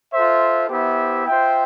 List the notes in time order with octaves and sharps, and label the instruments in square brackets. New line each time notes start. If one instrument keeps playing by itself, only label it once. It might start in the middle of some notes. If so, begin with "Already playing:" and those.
[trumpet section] F4 A4 C5 E5
B3 E4 G4 C5 E5
F4 C5 E5 G5